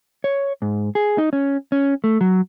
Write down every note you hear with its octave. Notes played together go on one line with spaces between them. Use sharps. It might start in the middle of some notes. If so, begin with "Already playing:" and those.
C#5
G#2
G#4
D#4
C#4
C#4
A3
F#3